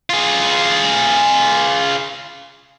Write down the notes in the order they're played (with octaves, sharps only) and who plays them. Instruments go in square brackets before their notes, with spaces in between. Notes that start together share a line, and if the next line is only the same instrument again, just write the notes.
[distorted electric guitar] F4 G#4